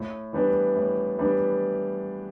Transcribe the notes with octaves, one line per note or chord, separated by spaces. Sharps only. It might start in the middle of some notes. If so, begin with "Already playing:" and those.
Already playing: A2
E3 G3 B3 D4
A2
E3 G3 B3 D4